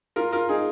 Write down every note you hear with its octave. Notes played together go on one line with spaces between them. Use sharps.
F4 A#4
F4 A#4
D#4 G#4